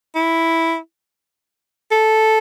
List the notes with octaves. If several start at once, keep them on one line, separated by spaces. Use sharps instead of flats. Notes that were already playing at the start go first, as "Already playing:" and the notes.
E4
A4